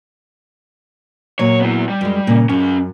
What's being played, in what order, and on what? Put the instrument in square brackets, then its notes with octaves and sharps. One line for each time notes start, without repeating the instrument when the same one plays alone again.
[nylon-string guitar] A#2 F#3 [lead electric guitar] C#5
[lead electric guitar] B3 E4
G3
[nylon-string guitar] F#2 G#3
A#2 C#3
[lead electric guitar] C#2 C#4 [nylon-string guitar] F#2